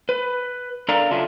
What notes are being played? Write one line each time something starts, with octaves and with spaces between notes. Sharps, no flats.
B4
D4 A4 A#4 D5 F5 A#5
C#3 F#3 D4 F4 A4 E5